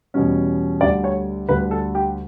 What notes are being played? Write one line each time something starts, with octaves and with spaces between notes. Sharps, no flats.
E2 B2 G3 C#4
D2 D3 G3 D5
C#5
D2 D3 G3 B4
A4
G4